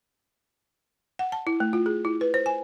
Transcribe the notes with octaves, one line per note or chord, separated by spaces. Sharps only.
F#5
A5
E4
A3
F4
G#4
E4
B4
C5
G#5